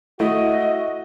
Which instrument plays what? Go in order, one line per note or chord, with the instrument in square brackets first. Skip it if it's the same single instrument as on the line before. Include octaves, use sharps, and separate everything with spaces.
[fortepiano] A3 E4 [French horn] F#4 [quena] D#5